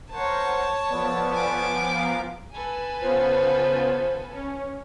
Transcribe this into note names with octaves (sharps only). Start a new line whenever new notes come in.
A#4 C5 C#5 F#5 A5
F3 B3 A4 B4 D5
G#5 D6
A#4 F5 A#5
A4 B4 G#5
C#3 B3 F4 C5
C#4